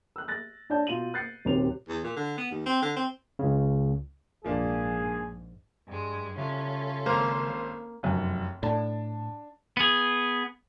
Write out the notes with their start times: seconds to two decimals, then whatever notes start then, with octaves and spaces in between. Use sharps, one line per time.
0.16 E6 F#6
0.28 F#6 A6 A#6
0.70 D4 C#5 D5 A5 G6
0.87 B2 F4 D#7 F#7
1.14 F#6 G6 A6 C7 C#7
1.45 D#1 D#2 C3 F#4 C#5 F7
1.88 E2
2.04 A#2
2.16 D3
2.38 B3
2.51 D#2
2.66 C4
2.82 D3
2.96 C4
3.39 C#2 C#3
4.44 A#1 G#2 F3 A#3 D4 G#4
5.86 G2 G#3
6.37 C#3 G3 C#4 F4 A4 E5
7.06 G#1 A#3 C5
8.03 F1 F#2
8.63 A2 D4 A5
9.77 B3 G#4